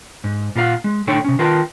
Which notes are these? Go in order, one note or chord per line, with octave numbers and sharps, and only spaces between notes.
G#2
A#2 F4 A#4 F5 F#5
G#3
A2 D3 D#4 A4 C#5 G5
C3 C#4
D#3 F4 A#4 B4 G5 A5